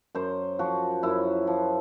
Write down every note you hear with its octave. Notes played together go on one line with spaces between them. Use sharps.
F#2 C5
F3 F#4
F#2 E4
F3